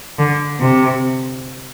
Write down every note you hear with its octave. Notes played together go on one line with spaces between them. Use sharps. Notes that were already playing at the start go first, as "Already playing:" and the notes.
D3
C3